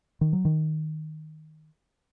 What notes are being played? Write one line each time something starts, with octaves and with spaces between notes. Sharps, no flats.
D#3
F#3
D#3